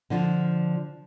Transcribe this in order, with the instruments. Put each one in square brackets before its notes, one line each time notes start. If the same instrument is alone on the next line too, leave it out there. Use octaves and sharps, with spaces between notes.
[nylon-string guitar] D3 F3